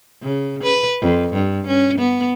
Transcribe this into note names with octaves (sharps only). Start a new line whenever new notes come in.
C#3
B4
F2
G2
C#4
B3